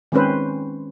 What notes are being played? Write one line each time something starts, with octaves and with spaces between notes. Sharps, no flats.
D#3 G#3 C4 C#4 B4 C5